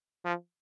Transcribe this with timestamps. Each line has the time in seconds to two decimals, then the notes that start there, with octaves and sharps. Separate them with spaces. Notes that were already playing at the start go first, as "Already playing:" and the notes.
0.25 F3